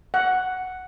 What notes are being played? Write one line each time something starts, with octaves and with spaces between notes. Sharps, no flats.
F#5